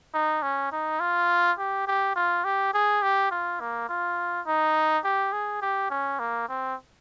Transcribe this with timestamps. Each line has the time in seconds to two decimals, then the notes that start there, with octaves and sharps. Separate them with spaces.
0.14 D#4
0.43 C#4
0.72 D#4
1.00 F4
1.58 G4
1.87 G4
2.16 F4
2.44 G4
2.73 G#4
3.02 G4
3.31 F4
3.60 A#3
3.89 F4
4.47 D#4
5.04 G4
5.33 G#4
5.62 G4
5.91 C#4
6.19 A#3
6.49 C4